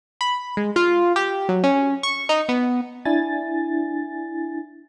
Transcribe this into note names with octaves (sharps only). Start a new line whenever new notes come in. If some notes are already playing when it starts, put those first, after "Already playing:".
B5
G#3
F4
G4
F#3
C#4
C#6
D#4
B3
D4 E4 G#5 A6